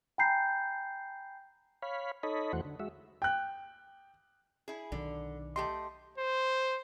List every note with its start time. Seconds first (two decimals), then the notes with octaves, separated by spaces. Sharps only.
0.18 G5 G#5 A#5 B5 G6 C7
1.82 C#5 F5 B5
2.23 D#4 A4 C#5 D#5 B5
2.53 E2 E3 A3 F#4 C5 F#5
2.65 D3
2.80 G#3 F#4 E5
3.22 G5 F#6
4.68 E4 G#4
4.92 B1 D3 D#3
5.56 A3 G4 D#5 C6
6.18 C5